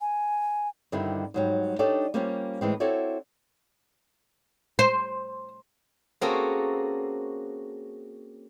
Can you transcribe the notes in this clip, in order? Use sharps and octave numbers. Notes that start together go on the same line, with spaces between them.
G#5
G2 D3 D#3 G3 C4 E4
G#2 F#3 G3
D4 D#4 G4 A4 C#5 D5
G3 A#3 C4 C#4 F4 G4
A2 E3 G#3 C4
C4 E4 F#4 A4 C#5 D5
C5
A#3 C4 C#4 F#4 G#4 A4